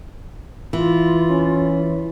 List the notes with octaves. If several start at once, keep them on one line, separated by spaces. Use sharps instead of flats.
E3 F4
C#4